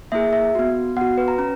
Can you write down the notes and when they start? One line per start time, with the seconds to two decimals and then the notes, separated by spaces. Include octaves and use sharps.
0.12 A#3 E4 G#4 E5
0.33 E5
0.55 B3 F#4
0.96 B3 F#5
1.01 F#4
1.18 B4
1.28 A#5
1.38 C#4 A#5